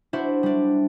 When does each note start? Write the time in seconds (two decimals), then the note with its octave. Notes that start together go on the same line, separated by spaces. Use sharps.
0.13 D4 E4 F#4 C5 E5
0.43 G3 D4